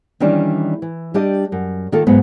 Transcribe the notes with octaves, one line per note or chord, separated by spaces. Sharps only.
D#3 E3 G3 C#4 D4
E3
G3 D4 G4 D#5
F#2
D#3 A#3 F4 A4
G#2 F#3 B3